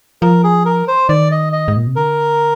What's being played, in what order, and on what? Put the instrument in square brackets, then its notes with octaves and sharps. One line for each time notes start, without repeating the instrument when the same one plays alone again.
[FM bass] F3 [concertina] A#4
[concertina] G#4
A#4
C5
[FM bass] D#3 [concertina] D5
[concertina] D#5
D#5
[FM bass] G#2
A#2
C3
[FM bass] D3 [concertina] A#4